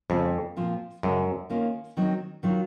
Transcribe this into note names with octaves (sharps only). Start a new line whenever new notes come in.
F2 C#3 G#3 C#4
A#2 F3 C4 F4
F#2 C#3 G#3 C#4
D#3 A#3 C#4 F4
D#3 F#3 C4 D#4
D#3 F#3 C#4 F4